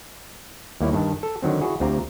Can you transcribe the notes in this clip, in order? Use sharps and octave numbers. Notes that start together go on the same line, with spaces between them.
D#2 G3 A#3 E4 C#5
G2 D#3 A5
A4
D3 D#3 F#3 C4
E4 F#4 G#4 D5
D2 C4 F4 G4 A#5